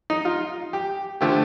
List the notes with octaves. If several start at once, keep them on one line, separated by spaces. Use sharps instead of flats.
D#4
F4
G4
D3 F3 A3 G4